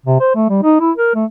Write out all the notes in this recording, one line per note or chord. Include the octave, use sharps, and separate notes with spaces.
C3
C5
A3
G3
D#4
E4
A#4
A3